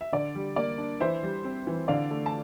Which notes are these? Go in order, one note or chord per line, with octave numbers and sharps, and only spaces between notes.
E5
D3 D5
G3
A#3 D5
D4
E3 C5 E5
G3
C4
E3
D3 D5 F5
A3
A5